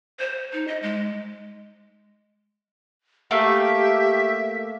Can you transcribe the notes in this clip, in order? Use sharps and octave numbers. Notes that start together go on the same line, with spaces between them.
C5
D#4
D#5
G#3
A3 A#3 G4 E5 F5